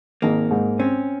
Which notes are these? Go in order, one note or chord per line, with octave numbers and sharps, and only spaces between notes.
G#1 A#3
G#2
C4 C#4